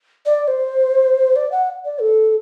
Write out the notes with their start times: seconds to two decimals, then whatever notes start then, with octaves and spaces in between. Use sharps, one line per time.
0.26 D5
0.48 C5
1.36 D5
1.52 F#5
1.85 D5
2.01 A4